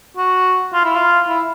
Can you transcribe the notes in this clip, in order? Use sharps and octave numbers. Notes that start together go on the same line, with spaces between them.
F#4
F4
E4
F4
E4